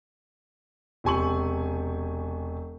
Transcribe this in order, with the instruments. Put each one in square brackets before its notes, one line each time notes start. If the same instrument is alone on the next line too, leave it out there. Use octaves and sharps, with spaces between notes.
[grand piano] E1 C3 G#5 C#6 F#7